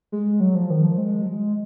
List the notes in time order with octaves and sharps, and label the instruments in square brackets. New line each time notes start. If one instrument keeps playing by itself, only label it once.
[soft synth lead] G#3
F#3
F3
D#3
F3
G#3
F#3
G#3